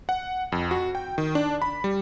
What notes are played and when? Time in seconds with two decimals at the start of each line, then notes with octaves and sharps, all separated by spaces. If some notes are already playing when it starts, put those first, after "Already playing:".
0.09 F#5
0.52 F2
0.71 F#4
0.95 G5
1.18 D#3
1.35 D4
1.62 B5
1.84 G3